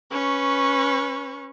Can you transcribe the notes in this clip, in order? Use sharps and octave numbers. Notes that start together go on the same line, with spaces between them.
C#4 B4 C#6